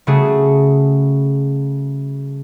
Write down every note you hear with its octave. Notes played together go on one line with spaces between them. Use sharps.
C#3 G3 A3 F#4 G#4